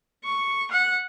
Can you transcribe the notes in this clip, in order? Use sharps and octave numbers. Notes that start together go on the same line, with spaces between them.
C#6
F#5